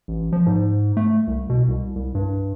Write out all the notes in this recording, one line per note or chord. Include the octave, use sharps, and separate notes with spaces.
A1
F3
G#2
A3
C2
B2
C2
C2
G2